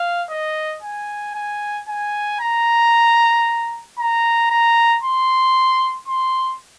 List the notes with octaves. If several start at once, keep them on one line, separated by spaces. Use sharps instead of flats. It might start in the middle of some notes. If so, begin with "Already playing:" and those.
Already playing: F5
D#5
G#5
G#5
G#5
A#5
A#5
A#5
C6
C6